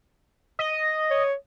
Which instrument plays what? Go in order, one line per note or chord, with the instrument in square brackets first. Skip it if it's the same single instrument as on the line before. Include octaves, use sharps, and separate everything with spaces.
[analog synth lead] D#5
[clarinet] C#5